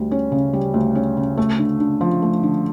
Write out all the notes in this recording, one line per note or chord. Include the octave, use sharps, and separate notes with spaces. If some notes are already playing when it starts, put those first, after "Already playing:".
Already playing: D2 G3
C#4
C#3
G3
D2
C#4
C#3
A3
D3
D3
F3
A3
D3